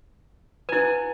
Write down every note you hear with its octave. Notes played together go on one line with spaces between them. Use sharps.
E4 B4 F#5 G#5